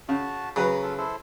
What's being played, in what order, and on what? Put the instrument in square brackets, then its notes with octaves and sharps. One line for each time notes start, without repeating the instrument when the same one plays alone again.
[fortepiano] C#3 [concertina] F#4 A5
[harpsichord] C#3 [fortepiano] F#3 B4 [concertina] A#5
[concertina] F4 A4
E4 A4 C5